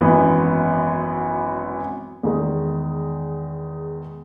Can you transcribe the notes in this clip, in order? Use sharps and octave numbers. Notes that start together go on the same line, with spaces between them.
G#1 F#2 E3 B3
E2 D#3 G#3